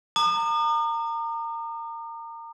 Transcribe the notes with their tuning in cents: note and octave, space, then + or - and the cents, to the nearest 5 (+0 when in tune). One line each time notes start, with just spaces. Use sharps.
A#5 -25 D#6 -45